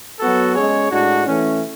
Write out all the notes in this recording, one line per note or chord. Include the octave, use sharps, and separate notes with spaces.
F#3 B3 F#4 A4
G#3 C#4 G#4 C#5
A2 G#3 D4 F#4
E3 A3 C#4